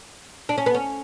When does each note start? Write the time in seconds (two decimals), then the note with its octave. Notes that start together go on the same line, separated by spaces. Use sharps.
0.49 D4
0.58 C#4
0.66 B3
0.75 C#4